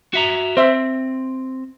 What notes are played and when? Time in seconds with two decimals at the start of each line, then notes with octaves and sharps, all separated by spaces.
0.14 F#4 E5 A#5
0.57 C4 C5 E5